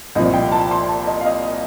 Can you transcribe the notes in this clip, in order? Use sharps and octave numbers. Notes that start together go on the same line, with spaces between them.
C2 A#2 F3 D#5
G5
A5
C6
A5
D#5
F5
D#5